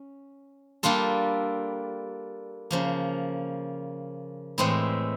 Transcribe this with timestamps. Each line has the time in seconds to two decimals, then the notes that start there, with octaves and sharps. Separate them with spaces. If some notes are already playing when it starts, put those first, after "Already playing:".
Already playing: C#4
0.83 G3 A#3 D4 F4 A4
2.71 C#3 F3 A#3
4.58 A2 E3 G#3 C4 E4